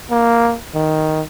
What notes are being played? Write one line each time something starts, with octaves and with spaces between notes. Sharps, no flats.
A#3
D#3